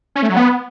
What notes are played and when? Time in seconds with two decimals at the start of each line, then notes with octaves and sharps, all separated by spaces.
0.16 C#4
0.23 A3
0.29 F#3
0.36 B3